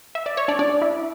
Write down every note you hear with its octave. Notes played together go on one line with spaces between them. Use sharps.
E5
D5
C#5
D4 D5
D4 D5
E4 E5